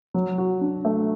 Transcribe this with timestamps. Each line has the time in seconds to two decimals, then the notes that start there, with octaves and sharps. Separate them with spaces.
0.14 F#3
0.38 F#4
0.61 D4
0.85 A3